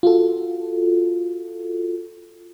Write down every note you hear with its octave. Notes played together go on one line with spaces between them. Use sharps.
F4 F#4 A4